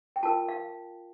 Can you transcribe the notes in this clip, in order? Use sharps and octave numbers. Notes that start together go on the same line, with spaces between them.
G5
F4 A#4 A5
F5